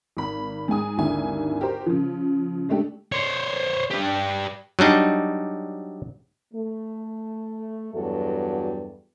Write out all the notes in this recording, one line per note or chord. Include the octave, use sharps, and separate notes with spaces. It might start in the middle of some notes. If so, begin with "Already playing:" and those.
G#1 B5
G#2 G#4 G#5 D#6
G#1 D#2 D3 E4 G#5
F#4 G4 A#4 C5
C#3 F3
G#3 A3 D4 G4 A4
C5 C#5
D4 G4
F#3 G3 D4 D#4
A3
E2 G2 F#3 F#4 A4